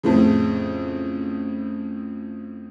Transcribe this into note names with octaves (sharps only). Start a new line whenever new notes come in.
F2 A2 C#3